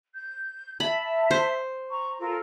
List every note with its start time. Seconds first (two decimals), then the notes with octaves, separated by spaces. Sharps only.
0.14 G6
0.80 E5 A5 B5
1.31 C5
1.90 A#5 C#6
2.19 F4 A4 A#4